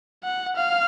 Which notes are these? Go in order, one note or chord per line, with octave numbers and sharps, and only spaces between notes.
F#5
F5